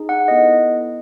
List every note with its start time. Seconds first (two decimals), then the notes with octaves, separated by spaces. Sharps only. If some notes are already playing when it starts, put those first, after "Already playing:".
Already playing: D#4 G#4
0.09 F#5
0.28 B3 E4 A4 D#5